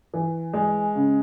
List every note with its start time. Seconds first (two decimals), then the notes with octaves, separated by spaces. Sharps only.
0.14 E3
0.53 G#3
0.95 C#3